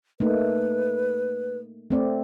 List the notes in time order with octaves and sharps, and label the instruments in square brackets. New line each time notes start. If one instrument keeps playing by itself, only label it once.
[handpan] A3 A#3 D#4 [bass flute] B4
[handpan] A3 C4 D5